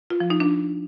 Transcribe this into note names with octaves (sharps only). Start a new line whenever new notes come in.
F4
F3
D#4
D4